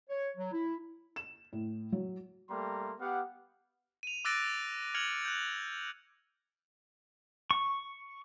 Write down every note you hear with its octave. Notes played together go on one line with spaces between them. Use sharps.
C#5
F#3
E4
E7
A2
F#3
G3 A3 A#3 A#5 C6
B3 G4 F5 F#5
D#7 F7
D6 E6 F#6 A6 A#6 D7
F6 G#6 C#7 F7 F#7
F#6 G6
C#6